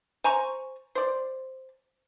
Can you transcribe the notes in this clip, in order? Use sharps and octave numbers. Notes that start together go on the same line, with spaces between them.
C5 G#5 A#5 C#6
C5 D5